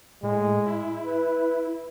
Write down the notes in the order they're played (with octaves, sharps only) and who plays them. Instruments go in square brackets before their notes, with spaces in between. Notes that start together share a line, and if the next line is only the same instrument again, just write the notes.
[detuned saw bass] A2 [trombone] G#3
[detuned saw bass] E4
[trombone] B4